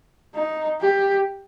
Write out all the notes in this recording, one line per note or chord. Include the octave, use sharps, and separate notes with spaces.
D#4
G4